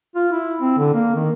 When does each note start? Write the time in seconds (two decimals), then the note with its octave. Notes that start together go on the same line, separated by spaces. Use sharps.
0.15 F4
0.32 E4
0.61 C4
0.78 D3
0.94 A#3
1.16 D#3